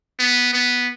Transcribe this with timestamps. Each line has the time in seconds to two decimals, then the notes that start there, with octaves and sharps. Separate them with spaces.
0.19 B3
0.53 B3